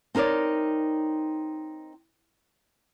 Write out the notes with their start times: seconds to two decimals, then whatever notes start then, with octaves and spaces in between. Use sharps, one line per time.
0.15 C4 D#4 A#4 C#5 D5